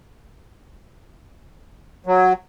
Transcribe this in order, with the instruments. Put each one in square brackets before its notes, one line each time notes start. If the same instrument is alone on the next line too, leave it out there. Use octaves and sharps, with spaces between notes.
[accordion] F#3